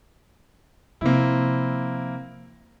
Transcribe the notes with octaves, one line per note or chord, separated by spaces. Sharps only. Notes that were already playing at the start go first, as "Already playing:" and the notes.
C3 F3 A#3 C4 E4